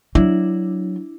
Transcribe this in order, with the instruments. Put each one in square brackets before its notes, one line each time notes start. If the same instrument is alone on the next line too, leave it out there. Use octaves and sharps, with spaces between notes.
[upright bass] F#3 [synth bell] D4 E4